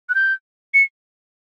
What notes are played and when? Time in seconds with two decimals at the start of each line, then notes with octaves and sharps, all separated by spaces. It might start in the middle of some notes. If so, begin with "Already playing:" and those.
0.09 F#6
0.15 G6
0.74 C#7